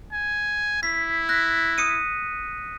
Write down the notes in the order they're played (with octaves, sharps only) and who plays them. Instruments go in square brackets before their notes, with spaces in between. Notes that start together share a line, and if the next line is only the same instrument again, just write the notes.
[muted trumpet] G#5
[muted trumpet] E4 [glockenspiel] B6
[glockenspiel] F#6 A#6
D#6 C#7 D#7